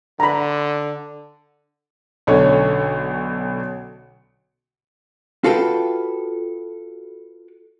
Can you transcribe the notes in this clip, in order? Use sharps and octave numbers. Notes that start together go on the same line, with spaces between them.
D3 A#5 B5
B1 D3 C#4 C#5
F4 F#4 A4 B4 G5